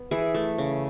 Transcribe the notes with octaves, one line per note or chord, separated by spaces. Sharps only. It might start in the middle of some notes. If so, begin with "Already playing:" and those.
Already playing: B3
E3 E4 G#4
A3
C#3